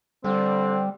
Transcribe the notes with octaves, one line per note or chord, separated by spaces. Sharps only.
D3 G3 C4